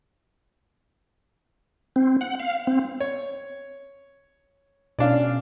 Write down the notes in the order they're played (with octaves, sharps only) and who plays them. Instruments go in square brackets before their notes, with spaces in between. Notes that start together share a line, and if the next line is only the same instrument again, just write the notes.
[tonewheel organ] C4
F#5
F5
C4
[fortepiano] C#5
[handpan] B2 C#4 F5 [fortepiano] D4 D5